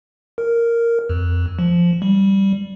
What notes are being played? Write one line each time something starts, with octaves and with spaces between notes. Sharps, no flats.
A#4
F2
F3
G3